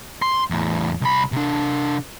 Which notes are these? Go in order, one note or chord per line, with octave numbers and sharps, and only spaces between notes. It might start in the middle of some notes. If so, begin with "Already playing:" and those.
C6
E2 A2
C2 B5
C3 D4